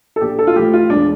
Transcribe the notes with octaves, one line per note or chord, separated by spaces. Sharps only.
A4
A#1 G4
A4
F4
A2 F3 G4
F4
E1 D4